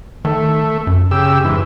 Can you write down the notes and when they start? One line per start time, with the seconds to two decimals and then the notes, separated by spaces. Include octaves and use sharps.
0.25 D#3 A3
0.87 F#2
1.11 C#3 G4 E6
1.45 G#2 E3